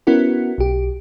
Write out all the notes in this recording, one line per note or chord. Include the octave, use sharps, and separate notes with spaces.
B3 C#4 E4 F#4 A#4
B1 G4